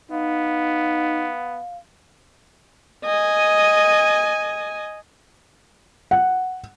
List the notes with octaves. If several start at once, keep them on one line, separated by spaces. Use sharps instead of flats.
B3 D#4 F5
D#5 G#5
F#5